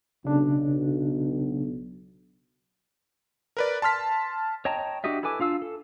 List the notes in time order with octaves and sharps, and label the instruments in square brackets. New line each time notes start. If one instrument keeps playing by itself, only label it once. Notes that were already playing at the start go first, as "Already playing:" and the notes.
[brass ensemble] B1 [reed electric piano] C#3 D4
[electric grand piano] A#4 B4 D5
A5 C6 F6 B6
[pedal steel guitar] C#5 D#5 G5 A5 A#5
D4 F#4 G4 D#5 E5
E4 A4 B4 G#5 D6
D4 F4 F5 E6
A4